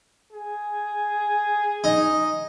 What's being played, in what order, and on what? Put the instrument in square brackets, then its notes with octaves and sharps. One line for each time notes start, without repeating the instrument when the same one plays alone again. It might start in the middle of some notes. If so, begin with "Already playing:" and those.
[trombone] G#4
[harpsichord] D#4